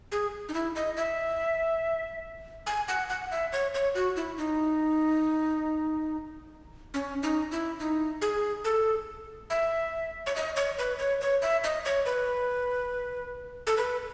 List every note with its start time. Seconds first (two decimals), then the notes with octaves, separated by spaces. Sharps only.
0.12 G#4
0.49 D#4
0.54 E4
0.75 D#5
0.97 E5
2.67 G#5
2.88 F#5
3.09 F#5
3.31 E5
3.52 C#5
3.74 C#5
3.95 F#4
4.16 E4
4.38 D#4
6.94 C#4
7.23 D#4
7.51 E4
7.79 D#4
8.22 G#4
8.64 A4
9.50 E5
10.26 C#5
10.36 D#5
10.56 C#5
10.78 B4
10.99 C#5
11.21 C#5
11.42 E5
11.64 D#5
11.85 C#5
12.06 B4
13.67 A4
13.77 B4